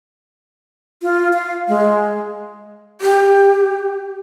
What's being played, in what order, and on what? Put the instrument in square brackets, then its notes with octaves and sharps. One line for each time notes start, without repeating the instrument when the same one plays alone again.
[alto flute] F4
F5
G#3
[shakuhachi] G4